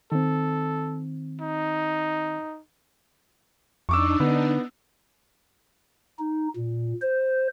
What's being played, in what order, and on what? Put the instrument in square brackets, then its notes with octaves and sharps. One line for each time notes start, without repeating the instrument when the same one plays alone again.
[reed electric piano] D#3 C4 [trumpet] A4
[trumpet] D#4
[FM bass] F2 [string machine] D4 D#4 [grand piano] C#6 D6 E6
[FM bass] D3 [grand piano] B3
[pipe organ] D#4
A#2
C5